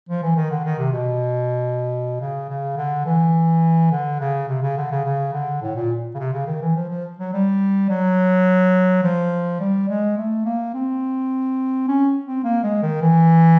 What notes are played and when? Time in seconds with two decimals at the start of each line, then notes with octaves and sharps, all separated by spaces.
0.09 F3
0.23 E3
0.36 D#3
0.50 D3
0.64 D#3
0.78 C3
0.93 B2
2.21 C#3
2.49 C#3
2.77 D3
3.06 E3
3.91 D3
4.20 C#3
4.48 C3
4.62 C#3
4.77 D3
4.91 C#3
5.05 C#3
5.33 D3
5.62 A2
5.76 A#2
6.14 C#3
6.19 C3
6.33 C#3
6.47 D#3
6.61 E3
6.76 F3
6.89 F3
7.19 F#3
7.33 G3
7.89 F#3
9.03 F3
9.60 G3
9.89 G#3
10.17 A3
10.45 A#3
10.74 C4
11.88 C#4
12.25 C4
12.44 A#3
12.63 G#3
12.82 D#3
13.01 E3